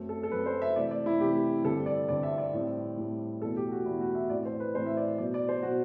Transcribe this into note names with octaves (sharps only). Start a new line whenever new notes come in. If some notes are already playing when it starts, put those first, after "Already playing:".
Already playing: F#2 F#3 A3 C4
A4
A4
F#2 F#3 A3 C4 B4
C5
E5
C3 E3 A3 D5
D5
E4
C3 E3 A3 G4
G2 D3 G3 C4 A4
D5
G2 D3 G3 C4 D5
E5
D5
A2 G3 C4
A2 G3 C4
E2 B2 A3 A4
G4
F#4
E2 B2 A3 E4
F#4
E5
A2 E3 A3 C4 D5
C5
B4
A2 E3 A3 C4 C5
E5
D5
B2 F#3 B3 D5
D5
C5
B2 F#3 B3 F#4